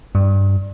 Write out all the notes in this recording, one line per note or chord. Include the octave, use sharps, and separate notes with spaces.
G2